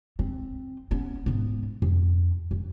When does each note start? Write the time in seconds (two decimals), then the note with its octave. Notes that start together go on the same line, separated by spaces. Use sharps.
0.19 C4
0.91 B3 C#4
1.26 G#2 B3
1.82 F2
2.51 F#2